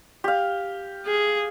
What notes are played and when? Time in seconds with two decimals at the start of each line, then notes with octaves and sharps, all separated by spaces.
0.24 G4 F5
1.06 G#4